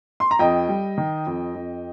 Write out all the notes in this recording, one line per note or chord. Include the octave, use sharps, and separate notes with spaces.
C6
A#5
F2 D#5 G5
G3
D#3
F2
F2